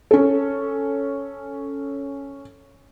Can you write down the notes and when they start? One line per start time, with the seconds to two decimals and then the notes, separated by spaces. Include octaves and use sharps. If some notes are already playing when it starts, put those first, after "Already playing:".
0.11 C#4 A4